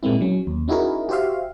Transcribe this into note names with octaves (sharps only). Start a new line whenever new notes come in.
A#2 G#3 A#3 C4 E4
F#3 C#4
D#2
C#4 D#4 E4 F#4 G#4 A#4
F#4 G4 C5 E5 F5